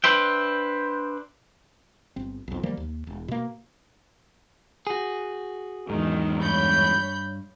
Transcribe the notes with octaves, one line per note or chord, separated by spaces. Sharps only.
D4 B4 C5 E5 G5
G1 C4
B1 F2
D#3 F3 G3 A#3
D#2
E1
B2 A#3
F#4 G#4
E2 G#2 D#3
G2 C#5 B5 G6